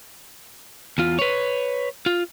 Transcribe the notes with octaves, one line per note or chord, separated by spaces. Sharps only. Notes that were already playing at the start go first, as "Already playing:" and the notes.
E2 F4
B4 C#5
F4